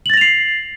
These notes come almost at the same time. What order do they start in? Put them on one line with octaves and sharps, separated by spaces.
F#7 A6 A#6 F7 C7